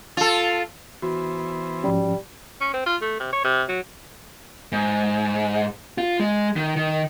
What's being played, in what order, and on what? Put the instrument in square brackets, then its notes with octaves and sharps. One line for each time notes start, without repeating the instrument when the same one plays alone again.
[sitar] F4 A4
[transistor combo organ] E3 B3 C5 [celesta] F#4
[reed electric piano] G#2 F3 C#4 [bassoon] G3
[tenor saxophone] C#4
C4
F4
A3
C3
C#5
C3
F#3
[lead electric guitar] G#2
F4
G#3
D#3
D#3